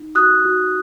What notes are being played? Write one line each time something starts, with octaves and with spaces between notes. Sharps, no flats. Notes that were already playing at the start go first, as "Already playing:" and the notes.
Already playing: D#4
F#4 D#6 F#6
F#4